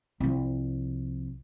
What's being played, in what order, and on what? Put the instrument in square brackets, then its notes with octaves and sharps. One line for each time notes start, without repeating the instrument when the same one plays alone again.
[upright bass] C2 F3